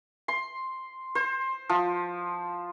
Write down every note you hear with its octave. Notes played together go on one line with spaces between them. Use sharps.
C6
C5
F3